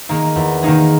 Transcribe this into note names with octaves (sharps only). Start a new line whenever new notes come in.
D#3 A#3 D#4 G#4
E2
D#3 A#3 D#4 G#4